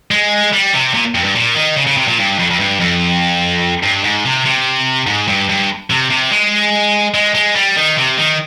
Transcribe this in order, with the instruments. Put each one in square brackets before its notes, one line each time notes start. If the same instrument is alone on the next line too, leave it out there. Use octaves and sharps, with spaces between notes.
[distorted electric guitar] G#3
G3
C3
A#2
F2
G2
A#2
D#3
C#3
C#3
C3
A#2
G2
F2
F2
G2
F2
G2
G#2
C3
C3
G#2
G2
G2
C3
C3
G#3
G#3
G#3
G3
D#3
C3
D#3